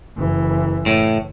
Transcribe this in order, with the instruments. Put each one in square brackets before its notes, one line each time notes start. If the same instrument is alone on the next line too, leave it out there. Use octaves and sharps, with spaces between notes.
[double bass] F#1 E3
[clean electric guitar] A2